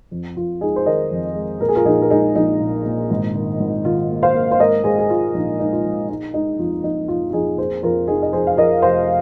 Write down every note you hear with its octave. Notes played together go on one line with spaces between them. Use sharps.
F2
F2 F4
G#3 D#4 G#4
C5
D#3 A#4 D#5
F2
G#3
A#2 A#4
G#4
F4 A#4
A#1 D#4 G#4
A#4
G#3 D#4 G#4
A#1 D#4
A#2
A#2
G#1
D#3
G#1
D#3 F4
A#3
C5 F5
A#3
C5
G#2 A#4 D#5
G#2 G#4 C5
G#4
G#3 F4
A#1 D#4
G#3 D#4
F4
A#1
G#3 D#4
G#3 D#4
F2 F4
F2 D#4
F2 F4
F4
F2 D#4 G#4
A#3 G#4 C5
F2 F4 A#4
F1 D#4 G#4
D#5
F3 G#4 C5
F5
F3 A#4 D#5
F1 C5 F5